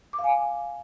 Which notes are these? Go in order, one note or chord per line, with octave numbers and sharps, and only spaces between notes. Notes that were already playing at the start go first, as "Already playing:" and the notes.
D6
F5
G#5